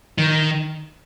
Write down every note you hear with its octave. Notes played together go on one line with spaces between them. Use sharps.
D#3